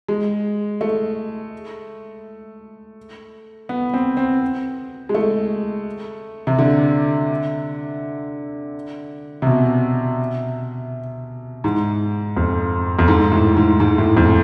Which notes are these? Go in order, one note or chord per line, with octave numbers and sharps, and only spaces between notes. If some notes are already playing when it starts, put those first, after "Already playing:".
G#3
A3
B3
C4
C4
G#3
A3
C3
D3
C3
B2
G#2
F2
F2
G#2
A2
G#2
G#2
A2
F2